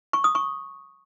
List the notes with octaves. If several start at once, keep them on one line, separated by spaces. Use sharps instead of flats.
C#6
D#6
C#6